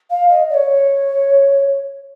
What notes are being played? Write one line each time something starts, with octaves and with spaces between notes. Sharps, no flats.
F5
D#5
D5
C#5